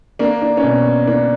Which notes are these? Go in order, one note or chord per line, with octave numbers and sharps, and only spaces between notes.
A#3 D4
D4
C#4
B2 D4
A#3 D4